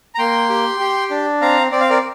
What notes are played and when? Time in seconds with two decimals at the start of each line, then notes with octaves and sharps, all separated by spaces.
0.15 A#5
0.19 A#3 G5 C6
0.49 G4
0.80 G4
1.10 D4
1.41 C4 F5 A#5
1.72 C4 D5
1.81 F5
1.89 A#4 D5